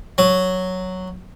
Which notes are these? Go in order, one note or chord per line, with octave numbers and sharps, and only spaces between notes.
F#3